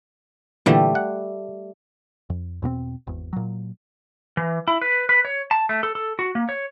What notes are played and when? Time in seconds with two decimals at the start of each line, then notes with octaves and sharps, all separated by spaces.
0.66 A#2 D3 E3 G3 A3
0.95 F#5
2.30 F2
2.62 E2 B2 A#3 C4
3.07 G#1 E2
3.33 A#2 F#3
4.37 E3
4.68 E4
4.81 B4
5.09 B4
5.25 C#5
5.51 A5
5.69 A3
5.83 A4
5.95 A4
6.19 F#4
6.35 A#3
6.49 C#5